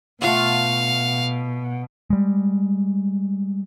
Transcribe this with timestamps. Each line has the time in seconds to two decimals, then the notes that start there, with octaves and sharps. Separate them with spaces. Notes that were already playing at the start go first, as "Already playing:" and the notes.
0.22 B2 A3 F4 F5 F#5
2.10 G3 G#3